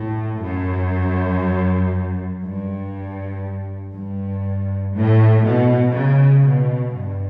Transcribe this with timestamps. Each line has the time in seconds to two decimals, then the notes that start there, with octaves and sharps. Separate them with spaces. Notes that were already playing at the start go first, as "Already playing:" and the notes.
Already playing: A2
0.41 F#2
2.42 G2
3.93 G2
4.93 A2
5.43 B2
5.93 C#3
6.44 B2
6.94 G2